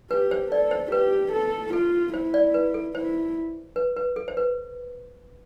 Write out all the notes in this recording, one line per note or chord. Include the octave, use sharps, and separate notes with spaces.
G4 B4
C5
A4 D5
C5
G4 B4
A4
F4 A4
E4 C5
D5
B4
A4
E4 C5
B4
B4
A4
C5
B4